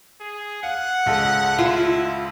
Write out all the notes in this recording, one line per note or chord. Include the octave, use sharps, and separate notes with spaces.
G#4
F5 F#5
C#2 G#3 A4
E4 F4